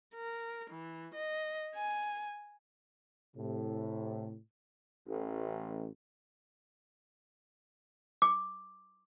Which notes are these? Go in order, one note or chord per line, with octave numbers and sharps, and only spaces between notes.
A#4
E3
D#5
G#5
A2 C3
A1
D6